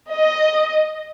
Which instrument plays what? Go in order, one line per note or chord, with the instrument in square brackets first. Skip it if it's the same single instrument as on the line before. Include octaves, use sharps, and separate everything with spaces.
[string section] D#5